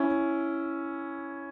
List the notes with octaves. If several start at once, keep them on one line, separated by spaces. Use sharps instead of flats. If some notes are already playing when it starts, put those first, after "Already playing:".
Already playing: C#4 E4